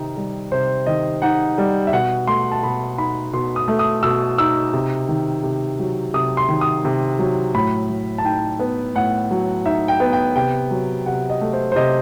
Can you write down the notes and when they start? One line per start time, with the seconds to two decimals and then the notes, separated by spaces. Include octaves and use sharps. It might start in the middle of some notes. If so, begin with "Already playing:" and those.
Already playing: C3 D#3 D#4
0.17 G3
0.52 C3 C5
0.86 D#3 D#5
1.22 D#4 F#5
1.58 G3
1.87 E5
1.93 B2 F#5
2.27 A3 C6
2.51 A5
2.63 B2 B5
2.98 D#4 B5
3.33 B2 C6
3.56 D#6
3.68 A3
3.79 D#6
4.03 B2 E6
4.38 D#4 E6
4.73 C3
5.09 D#3
5.43 C3
5.80 F#3
6.14 C3 D#6
6.37 C6
6.49 D#3
6.61 D#6
6.85 C3
7.19 F#3
7.54 A2 B5
7.89 F#3
8.18 A5
8.24 D#4 G5
8.59 B3
8.95 A2 F#5
9.31 F#3
9.65 D#4 E5
9.88 G5
10.00 B3
10.13 G5
10.35 C3 G5
10.71 F#3
11.06 C3 F#5
11.30 D#5
11.41 A3
11.53 C5
11.72 C5
11.76 C3 D#5